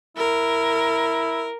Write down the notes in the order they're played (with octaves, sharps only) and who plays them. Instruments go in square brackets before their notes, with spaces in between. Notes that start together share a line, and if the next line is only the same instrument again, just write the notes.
[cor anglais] E4 [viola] A#4